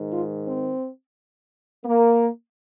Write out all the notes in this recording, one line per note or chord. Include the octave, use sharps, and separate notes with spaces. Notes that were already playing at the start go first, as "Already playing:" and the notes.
Already playing: G#2 D#3
F4
C4
A#3